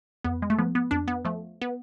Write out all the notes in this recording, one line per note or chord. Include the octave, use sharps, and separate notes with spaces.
F2 B3
G#3
A3
F3 B3
B3
F2 D4
B3
F3 A3
B3